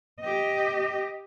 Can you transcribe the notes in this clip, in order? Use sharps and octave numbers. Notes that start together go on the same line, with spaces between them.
G4 D#5